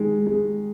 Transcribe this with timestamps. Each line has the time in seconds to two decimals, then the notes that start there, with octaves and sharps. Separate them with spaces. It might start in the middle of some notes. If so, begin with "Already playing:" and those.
Already playing: D#3 G#3
0.27 G#3